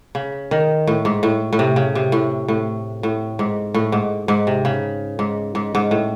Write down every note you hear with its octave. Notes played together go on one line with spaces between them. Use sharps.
C#3
D#3
A2
G#2
A2
A2
C3
C#3
C3
A2
A2
A2
G#2
A2
G#2
G#2
C3
C#3
G#2
G#2
G#2
A2